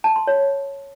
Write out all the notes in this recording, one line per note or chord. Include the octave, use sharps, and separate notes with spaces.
A5
C6
C#5